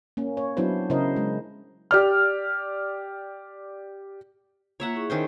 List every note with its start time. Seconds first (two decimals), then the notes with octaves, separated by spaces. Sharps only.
0.17 A#3 C#4
0.37 C#5
0.57 F#3 B3 D4 E4 C5
0.90 C#3 E4 A#4 C5 D#5
1.16 G#3
1.91 G4 D5 F6
4.80 A#3 F4 C#5 E5 F#5 A#5
4.95 E4 G#4 C#6
5.10 D#3 C#4 C5